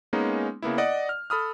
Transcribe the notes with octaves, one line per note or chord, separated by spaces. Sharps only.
G#3 A#3 B3 C#4 D#4
C#3 A#3 B3 E4
D5 D#5 F#5
F6
A4 B5 D#6 F6